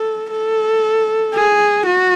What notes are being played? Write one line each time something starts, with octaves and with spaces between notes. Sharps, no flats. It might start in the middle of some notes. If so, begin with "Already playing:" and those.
Already playing: A4
A4
G#4
F#4